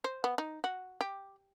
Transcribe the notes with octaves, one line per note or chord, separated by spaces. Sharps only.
C5
B3
D#4
F#4
G4